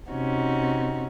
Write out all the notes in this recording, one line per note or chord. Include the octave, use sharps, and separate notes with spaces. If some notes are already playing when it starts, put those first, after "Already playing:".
C3 C#4 D#4 F#4